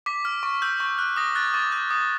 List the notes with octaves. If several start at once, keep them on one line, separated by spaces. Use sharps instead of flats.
D6 B6
F6
C#6
E6 G6
C#6
F#6
D#6 A#6
F#6 A6
D6 A6
G6
D#6